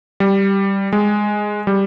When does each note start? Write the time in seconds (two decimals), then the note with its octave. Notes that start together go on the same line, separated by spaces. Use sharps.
0.20 G3
0.93 G#3
1.67 G3